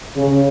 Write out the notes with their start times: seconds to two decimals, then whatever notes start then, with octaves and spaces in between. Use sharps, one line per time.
0.16 C#3